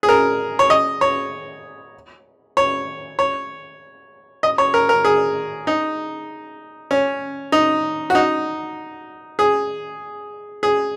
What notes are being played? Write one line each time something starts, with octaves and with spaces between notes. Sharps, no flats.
G#4
A#4
C#5
D#5
C#5
C#5
C#5
D#5
C#5
A#4
A#4
G#4
D#4
C#4
D#4
F#4
D#4
G#4
G#4